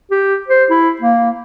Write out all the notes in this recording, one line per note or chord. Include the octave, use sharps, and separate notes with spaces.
G4
C5
E4
A#3